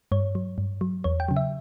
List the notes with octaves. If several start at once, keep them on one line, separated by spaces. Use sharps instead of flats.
G2 C#5
F#3
G2
F#3
E2 C#5
G5
C#3 F#3
E5